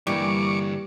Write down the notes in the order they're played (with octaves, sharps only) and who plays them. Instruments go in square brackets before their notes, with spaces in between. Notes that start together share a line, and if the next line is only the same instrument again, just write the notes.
[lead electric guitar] G2 D3 [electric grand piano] E3 A#3 [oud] G3 [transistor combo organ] C#6 D6